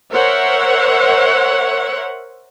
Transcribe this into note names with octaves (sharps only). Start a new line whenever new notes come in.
A#4 C5 C#5 E5 F#5